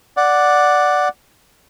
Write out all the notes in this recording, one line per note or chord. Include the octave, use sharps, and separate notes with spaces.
D5 F#5